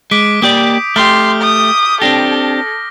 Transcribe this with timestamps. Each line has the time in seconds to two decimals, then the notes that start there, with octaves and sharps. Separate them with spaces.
0.11 G#3 D6 B6 D7
0.42 A#3 G4 D5 D#6 G6
0.96 A3 G4 C6 D6 F6 G7
1.42 D#6
2.02 C4 D4 G4 A4 A#6